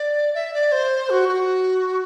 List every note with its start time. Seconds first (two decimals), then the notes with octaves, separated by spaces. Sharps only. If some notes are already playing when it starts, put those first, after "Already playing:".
Already playing: D5
0.34 E5
0.54 D5
0.72 C5
1.10 F#4
1.29 F#4